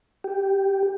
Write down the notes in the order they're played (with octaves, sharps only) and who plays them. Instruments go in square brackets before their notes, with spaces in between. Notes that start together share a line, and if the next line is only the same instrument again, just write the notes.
[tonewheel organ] G4